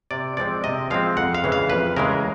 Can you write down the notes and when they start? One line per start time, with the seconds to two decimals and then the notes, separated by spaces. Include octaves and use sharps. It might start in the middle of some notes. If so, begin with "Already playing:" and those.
0.11 C3 D5
0.37 F3 G#3 C4 D5
0.64 C3 D#5
0.90 F3 G#3 C4 F5
1.17 F2 F#5
1.35 F5
1.44 C#3 E3 G#3
1.52 F5
1.70 F2 B4
1.96 C#3 E3 G#3 A#4